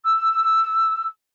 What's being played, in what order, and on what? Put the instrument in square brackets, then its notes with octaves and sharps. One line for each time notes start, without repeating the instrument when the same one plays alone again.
[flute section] E6